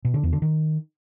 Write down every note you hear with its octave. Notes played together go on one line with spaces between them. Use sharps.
B2
D3
E2
D3
D#3